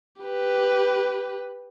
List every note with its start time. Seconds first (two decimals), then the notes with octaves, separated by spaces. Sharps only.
0.22 G4 B4